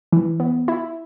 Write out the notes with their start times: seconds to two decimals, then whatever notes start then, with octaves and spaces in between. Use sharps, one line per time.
0.12 E3
0.40 B3
0.68 E4